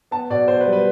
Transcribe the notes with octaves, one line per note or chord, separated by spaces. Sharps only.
B3 A5
B2 D5
B2 C5
B4
G3
B4